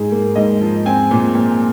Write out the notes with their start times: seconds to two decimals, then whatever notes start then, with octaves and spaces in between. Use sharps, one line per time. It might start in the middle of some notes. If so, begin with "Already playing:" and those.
Already playing: G#2 G#4
0.12 A#3
0.35 G#2 D#5
0.61 F3
0.86 C4 G#5
1.11 A#2
1.35 A#2